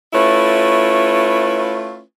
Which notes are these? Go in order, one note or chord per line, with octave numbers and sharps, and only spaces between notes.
A3 C#4 E4 F4 B4